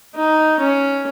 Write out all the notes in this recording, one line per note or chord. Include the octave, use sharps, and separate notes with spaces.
D#4
C#4